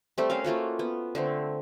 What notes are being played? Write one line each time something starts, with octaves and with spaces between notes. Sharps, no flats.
G3 A3 C4
A3 C#4 A#4 F5
A3 A#3 F4 F#4
B3
D3 A3 C4